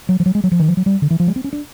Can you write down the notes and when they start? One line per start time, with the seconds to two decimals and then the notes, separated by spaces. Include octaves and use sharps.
0.09 F#3
0.20 F3
0.26 F#3
0.35 G#3
0.44 F#3
0.52 F3
0.59 D#3
0.68 F3
0.77 F#3
0.86 G3
1.02 D3
1.10 E3
1.20 F3
1.27 G#3
1.36 C4
1.44 C#4
1.53 D4